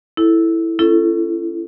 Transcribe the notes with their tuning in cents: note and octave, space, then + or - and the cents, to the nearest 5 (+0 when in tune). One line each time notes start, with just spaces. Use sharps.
E4 +0 A4 +0
C#4 +0 E4 +40 A4 +5